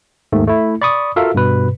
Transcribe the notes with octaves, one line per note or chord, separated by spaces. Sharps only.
D#2 G#2 D#3 A3
A3 E4
D5 B5 C#6 D#6
F4 F#4 A4 A#4 E5 F5
G2 B2 B4